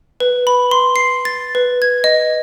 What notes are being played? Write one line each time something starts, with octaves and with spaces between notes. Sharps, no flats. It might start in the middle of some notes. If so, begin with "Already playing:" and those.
B4
B5
C6
C7
A6
B4
G#6
D#5